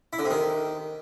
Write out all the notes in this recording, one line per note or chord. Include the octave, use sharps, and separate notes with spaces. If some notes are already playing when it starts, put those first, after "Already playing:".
E4
D3
C3
D#3